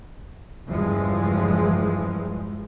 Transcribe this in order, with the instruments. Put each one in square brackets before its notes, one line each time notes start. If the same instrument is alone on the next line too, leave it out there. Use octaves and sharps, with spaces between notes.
[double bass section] F#1 E2 G2 E3 F3 G#3